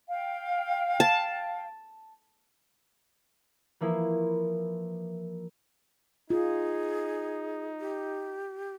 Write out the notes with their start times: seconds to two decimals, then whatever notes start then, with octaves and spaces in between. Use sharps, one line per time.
0.08 F5 G5
1.00 A5
3.80 E3 F3 A#3 E4
6.30 D#4 F4 G#4
7.80 G4